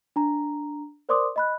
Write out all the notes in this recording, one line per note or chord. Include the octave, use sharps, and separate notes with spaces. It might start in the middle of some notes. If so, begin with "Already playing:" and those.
D4 A#5
A#4 C5 D5 C6 D6 D#6
D#5 B5 F#6